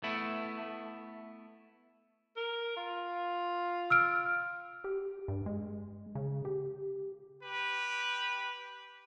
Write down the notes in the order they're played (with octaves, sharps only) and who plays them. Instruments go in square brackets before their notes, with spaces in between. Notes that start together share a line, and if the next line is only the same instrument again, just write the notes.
[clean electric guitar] A3 B3 E4
[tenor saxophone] A#4
F4
[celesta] E6 F6 D7
[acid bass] G4
G2
G#3
C#3
G4
[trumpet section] G4 B4